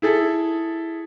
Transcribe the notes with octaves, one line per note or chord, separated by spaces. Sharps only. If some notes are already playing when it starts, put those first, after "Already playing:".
E4 G#4 A4